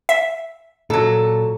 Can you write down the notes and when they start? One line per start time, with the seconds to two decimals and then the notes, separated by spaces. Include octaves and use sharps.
0.09 E5
0.90 A#2 F#3 A4